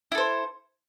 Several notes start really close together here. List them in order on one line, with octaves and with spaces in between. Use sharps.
E4 A4 C5